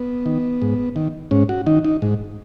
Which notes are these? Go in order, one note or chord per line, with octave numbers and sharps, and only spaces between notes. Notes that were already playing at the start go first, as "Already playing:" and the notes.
Already playing: B3
D#3
G#2
D#3
G#2 C#4
F#4
D#3 D#4
D#4
G#2